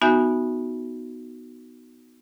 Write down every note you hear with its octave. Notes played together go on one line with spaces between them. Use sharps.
B3 D#4 F#4 E5 G#5 G6